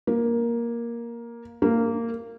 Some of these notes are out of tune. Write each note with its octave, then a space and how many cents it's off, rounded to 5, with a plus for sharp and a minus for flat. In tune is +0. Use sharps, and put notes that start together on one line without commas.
A#3 +10
A#3 -15